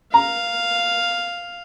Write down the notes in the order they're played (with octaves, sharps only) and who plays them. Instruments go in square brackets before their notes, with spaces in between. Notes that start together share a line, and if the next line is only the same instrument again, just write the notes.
[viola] F5 [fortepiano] A#5